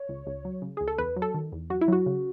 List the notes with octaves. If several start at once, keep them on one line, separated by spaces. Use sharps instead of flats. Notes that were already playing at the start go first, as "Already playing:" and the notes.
Already playing: C#5
C#2
C#2
F#3
C#3
C#2 G#4
A4
E2 B4
F#3
A4
D#3
E2
F#2 F#4
E4
F#3 F#4
C#3